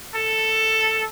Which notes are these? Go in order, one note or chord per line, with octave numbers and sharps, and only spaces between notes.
A4